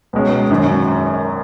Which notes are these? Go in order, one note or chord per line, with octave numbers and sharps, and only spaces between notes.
C#2 B2 G#3 C#4
G#1 F#2 D#3 F#3 C#4